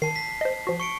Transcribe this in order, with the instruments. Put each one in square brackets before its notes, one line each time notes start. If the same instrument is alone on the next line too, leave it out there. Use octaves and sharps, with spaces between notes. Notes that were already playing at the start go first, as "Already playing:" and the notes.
[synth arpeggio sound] D#3 [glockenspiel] A5 C7
[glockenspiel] B6
[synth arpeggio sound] C5 D#5
F3 F#4
[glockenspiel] C#6 C#7 D7